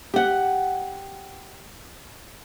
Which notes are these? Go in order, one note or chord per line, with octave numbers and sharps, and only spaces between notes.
G4 F#5